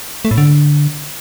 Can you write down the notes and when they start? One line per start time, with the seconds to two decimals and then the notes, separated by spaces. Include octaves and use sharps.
0.25 A3
0.31 A2
0.38 D3